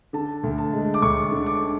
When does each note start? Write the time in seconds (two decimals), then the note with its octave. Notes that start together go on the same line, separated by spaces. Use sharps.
0.13 D3 A5
0.43 D2
0.58 A5
0.73 G#3
0.94 D6
1.02 D2 C#6
1.31 D3
1.46 D6